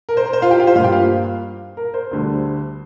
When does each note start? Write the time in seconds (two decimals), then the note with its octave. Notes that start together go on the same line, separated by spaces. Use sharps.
0.09 A#4
0.17 C5
0.26 A#4
0.33 C5
0.42 F4 F5
0.51 G4 G5
0.60 F4 F5
0.67 C5
0.75 G2 G3 A#3 F4 F5
0.84 G4 G5
0.92 F4 F5
1.77 A#4
1.94 C5
2.11 D2 D3 G3